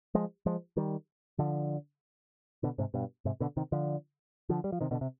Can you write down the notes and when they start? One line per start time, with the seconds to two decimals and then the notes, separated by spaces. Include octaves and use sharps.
0.15 F3 G#3
0.46 F3 G#3
0.77 D#3 G3
1.38 D3 F3
2.63 B2 D3
2.78 G#2 C3
2.94 G2 B2
3.25 G#2 C3
3.40 B2 D3
3.57 C3 D#3
3.72 D3 F3
4.49 D3 F3
4.64 G3
4.72 F3
4.81 C3 D#3
4.91 B2 D3
5.01 C3